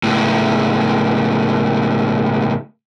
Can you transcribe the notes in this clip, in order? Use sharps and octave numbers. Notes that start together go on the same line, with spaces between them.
C#2 A2